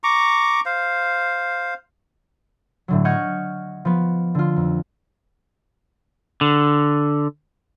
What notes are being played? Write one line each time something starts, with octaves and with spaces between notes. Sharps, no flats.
A#5 C#6 D6
C5 F5
A2 D3 F#3
D#5 F#5 C#6 F6 G6 G#6
F3 B3
D3 F4
F2
D3